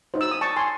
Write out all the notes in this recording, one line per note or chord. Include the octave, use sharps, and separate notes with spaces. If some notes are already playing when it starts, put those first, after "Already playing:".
D#4 F#4 C5
E6
D#6
A5 C#6
G#5 C6